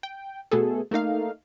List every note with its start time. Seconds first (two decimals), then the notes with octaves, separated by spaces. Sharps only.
0.03 G5
0.51 B2 A3 B3 G#4 A4
0.91 A3 A#3 D#4 F5